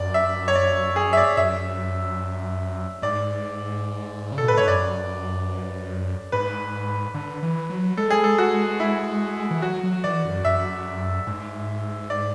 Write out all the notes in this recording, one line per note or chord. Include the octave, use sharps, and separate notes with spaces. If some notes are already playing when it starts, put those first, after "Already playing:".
Already playing: F#2 D5
E5
C#5
D5
G#4
E5
D5
F#2 E5
G#2 D5
C#3
B2 A4
A2 B4
G#2 C#5
F#2 D5
G#2 B4
D3
E3
F#3
G#3 A4
G#4
A4
F#4
E4
E3
F#3 F#4
F#3
E3 D5
F#2
F#2 E5
G#2
D5